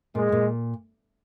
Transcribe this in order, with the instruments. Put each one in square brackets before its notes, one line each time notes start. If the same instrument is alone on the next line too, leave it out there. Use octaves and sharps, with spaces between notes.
[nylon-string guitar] A#2 [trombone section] G#3
[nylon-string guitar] A#2